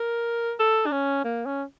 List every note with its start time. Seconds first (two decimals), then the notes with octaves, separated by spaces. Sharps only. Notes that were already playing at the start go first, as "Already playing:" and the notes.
Already playing: A#4
0.59 A4
0.86 D4
0.92 C#4
1.24 A#3
1.46 C#4